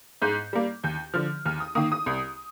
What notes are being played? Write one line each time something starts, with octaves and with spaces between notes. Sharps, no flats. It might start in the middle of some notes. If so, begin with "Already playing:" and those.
G#2 G6
G3 A#3
D#2 G6
D3 F3 F6
D#2 F6
D#6
D#3 A#3 D#6
D#6
C2